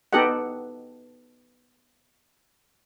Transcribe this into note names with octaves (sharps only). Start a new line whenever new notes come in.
B3 D#4 G4 A4 D#5 F#5